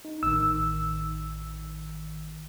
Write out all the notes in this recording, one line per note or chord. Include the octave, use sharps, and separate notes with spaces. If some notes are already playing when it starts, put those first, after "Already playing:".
D#4
A1 D#3 E6